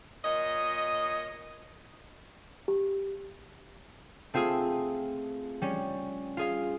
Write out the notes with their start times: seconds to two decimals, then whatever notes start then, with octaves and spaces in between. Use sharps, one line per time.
0.25 A#2 C#5 D#5
2.68 G4
4.34 A3 C4 F4 G#4
5.62 G3 C#4
6.37 F4 G#4 F5